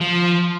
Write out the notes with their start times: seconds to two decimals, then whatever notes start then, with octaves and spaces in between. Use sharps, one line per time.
0.01 F3